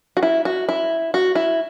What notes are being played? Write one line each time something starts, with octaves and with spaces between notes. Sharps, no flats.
F#4
E4
F#4
E4
F#4
E4